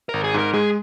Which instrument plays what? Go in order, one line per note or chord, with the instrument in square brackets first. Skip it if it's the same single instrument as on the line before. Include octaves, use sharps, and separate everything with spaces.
[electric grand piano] G#1 [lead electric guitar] A#4
[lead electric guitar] G#4
[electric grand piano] G#2 [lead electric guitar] A#4
[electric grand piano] G#3 [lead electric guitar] G#4